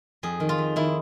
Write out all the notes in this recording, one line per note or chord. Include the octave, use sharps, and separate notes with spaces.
F2 G#4
D#3
F4
F2
D#3 E4